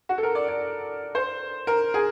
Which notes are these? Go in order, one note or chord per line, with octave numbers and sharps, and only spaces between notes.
F#4
A4
A#4
D5
D5
C5
A#4
G#4